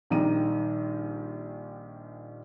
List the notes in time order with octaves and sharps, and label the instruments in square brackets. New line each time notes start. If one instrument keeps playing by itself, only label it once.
[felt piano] A#1 D#3 G3 A#5 D#7